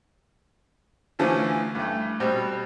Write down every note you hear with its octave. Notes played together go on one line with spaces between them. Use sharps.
D3 E3 F3 A3 C#4
G2 A3
B2 G3 C4